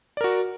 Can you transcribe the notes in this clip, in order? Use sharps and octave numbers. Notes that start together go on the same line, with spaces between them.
F#4 A#4 D5